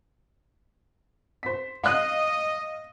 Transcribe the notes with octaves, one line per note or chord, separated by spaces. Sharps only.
C5 B6
D#5 F5 F#6